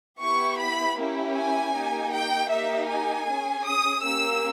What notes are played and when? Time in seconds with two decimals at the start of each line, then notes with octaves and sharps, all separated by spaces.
0.20 B3 E4 G4 C#6
0.59 B5
0.97 A#3 C#4 E4 G4
1.36 G#5
1.74 A#3 D#4 G4
2.13 G5
2.50 A#3 D#4 G4 E5
2.89 G#5
3.26 G#4
3.32 C#4
3.65 D#6
4.03 A#3 C#4 G4 E6